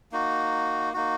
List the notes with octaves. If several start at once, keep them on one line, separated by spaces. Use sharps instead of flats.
A#3 D#4 F#4
A#3 D#4 F#4